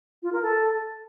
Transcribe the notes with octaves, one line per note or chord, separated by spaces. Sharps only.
F4
A#4
A4